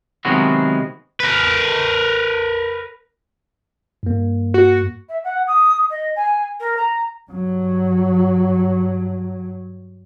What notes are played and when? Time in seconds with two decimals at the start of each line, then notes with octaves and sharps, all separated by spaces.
0.25 C3 D#3 F#3 G#3 B3 F#4
1.20 A#4 B4
4.03 G2 A#3
4.54 F#4
5.09 E5
5.24 F#5
5.47 D#6
5.90 D#5
6.16 G#5
6.60 A#4
6.77 A#5
7.31 G2 F#3